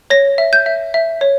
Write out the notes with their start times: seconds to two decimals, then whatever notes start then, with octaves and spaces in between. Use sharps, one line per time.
0.10 C#5 A#6
0.38 E5
0.53 G6
0.66 E5
0.94 E5
1.21 C#5